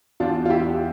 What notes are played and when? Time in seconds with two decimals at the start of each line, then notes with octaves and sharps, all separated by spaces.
0.20 E2 E3 D4 F4
0.45 F4
0.50 E4 G4